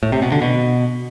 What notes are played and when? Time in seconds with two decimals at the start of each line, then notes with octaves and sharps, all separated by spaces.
0.03 A2
0.12 C3
0.22 B2
0.32 D3
0.42 B2